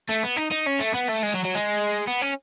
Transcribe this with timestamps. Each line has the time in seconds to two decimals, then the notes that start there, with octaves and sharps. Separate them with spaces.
0.09 A3
0.23 B3
0.36 D#4
0.51 D#4
0.66 C#4
0.79 A3
0.94 B3
1.08 A3
1.22 G#3
1.34 F#3
1.45 F#3
1.55 G#3
2.08 B3
2.22 C#4